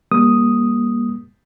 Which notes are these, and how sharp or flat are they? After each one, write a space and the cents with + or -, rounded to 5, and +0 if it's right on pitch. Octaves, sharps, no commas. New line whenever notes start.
G3 +45 A#3 +30 D#6 +0